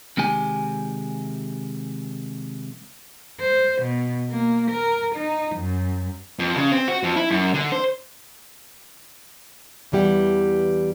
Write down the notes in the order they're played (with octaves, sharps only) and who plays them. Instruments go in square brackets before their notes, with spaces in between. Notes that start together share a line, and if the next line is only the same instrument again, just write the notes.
[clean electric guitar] C3 D#3 G#3 G4 G#5
[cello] C5
B2
A#3
A#4
D#4
F#2
[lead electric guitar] F2
C#3
C4
F#4
F2
E4
F#2
D3
C5
[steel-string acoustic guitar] E2 E3 G3 G4 F#5